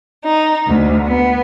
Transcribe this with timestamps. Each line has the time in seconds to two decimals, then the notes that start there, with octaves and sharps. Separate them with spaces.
0.24 D#4
0.66 D2
1.07 B3